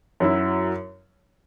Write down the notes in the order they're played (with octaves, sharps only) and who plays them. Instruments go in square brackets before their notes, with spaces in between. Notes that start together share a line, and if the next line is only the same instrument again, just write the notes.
[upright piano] F#2 F#3 E4